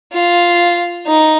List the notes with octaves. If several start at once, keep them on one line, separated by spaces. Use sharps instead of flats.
F4
D#4